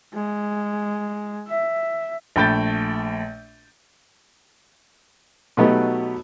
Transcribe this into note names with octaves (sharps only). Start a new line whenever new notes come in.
G#3
E5
A#1 A3 G5 B5 G6 A6
B2 F#3 A3 B3 D#4 G4